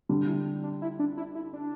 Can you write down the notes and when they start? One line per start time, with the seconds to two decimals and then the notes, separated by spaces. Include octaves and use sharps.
0.09 D3 G3 D4
0.27 E4
0.63 D4
0.82 E4
0.99 D4
1.17 E4
1.35 E4
1.53 D4